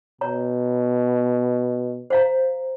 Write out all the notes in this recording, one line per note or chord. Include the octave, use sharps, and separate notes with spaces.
B2 C#5 A#5
C5 F5 A#5